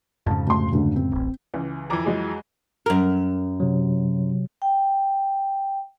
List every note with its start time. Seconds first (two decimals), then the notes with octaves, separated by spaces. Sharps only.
0.26 F2 G#2 C#3 A5
0.47 D2 C6
0.72 D2 D3
0.96 C4
1.12 D1 A1
1.54 C#2 E3
1.90 F2 E3 A#5 D6
2.05 F#3 G#3 G#4
2.86 F#2 A#4
3.60 C3 F#3
4.62 G5